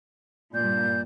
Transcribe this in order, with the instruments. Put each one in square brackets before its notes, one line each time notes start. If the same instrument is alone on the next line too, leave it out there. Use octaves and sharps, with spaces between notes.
[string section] G2 A#2 [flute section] D5 G6